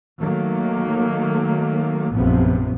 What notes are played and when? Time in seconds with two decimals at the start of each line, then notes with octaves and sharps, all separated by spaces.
0.20 D#3 F#3 A3 A#3
2.12 F1 A#1 F#2 C3 F3 B3